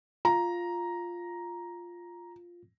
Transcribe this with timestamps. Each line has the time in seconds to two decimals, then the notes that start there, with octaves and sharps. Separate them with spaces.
0.25 F4 A#5